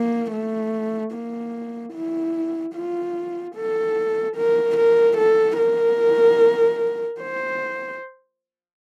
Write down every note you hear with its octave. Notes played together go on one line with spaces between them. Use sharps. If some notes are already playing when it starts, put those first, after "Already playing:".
Already playing: A#3
A3
A#3
E4
F4
A4
A#4
A#4
A4
A#4
C5